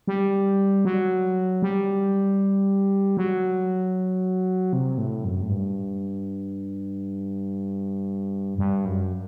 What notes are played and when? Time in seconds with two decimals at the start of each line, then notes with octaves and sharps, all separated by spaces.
0.07 G3
0.85 F#3
1.62 G3
3.17 F#3
4.73 C3
4.98 A2
5.24 F#2
5.42 A2
5.49 G2
8.58 G2
8.85 F#2